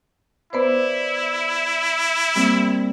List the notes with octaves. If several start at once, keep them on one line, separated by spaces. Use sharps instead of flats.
B3 E4 B4 C5 D5
G3 A#3 C4